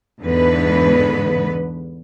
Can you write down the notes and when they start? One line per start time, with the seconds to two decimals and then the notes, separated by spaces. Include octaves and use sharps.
0.22 E2 G#2 D3 B3 B4